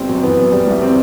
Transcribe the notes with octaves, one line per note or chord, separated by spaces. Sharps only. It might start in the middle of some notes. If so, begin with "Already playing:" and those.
Already playing: G1 G3 C4
F#2
E3 B3
F#2
G3
C2
C3 C4